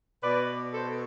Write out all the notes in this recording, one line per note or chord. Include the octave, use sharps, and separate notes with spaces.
B2 B4 D5
A4 C5